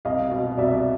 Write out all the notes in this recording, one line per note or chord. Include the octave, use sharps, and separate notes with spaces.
C2 D#5 F5
B2
C2 D5 E5